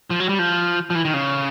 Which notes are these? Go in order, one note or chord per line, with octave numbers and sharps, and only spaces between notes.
F3
F#3
G3
F3
F3
E3
D#3
C#3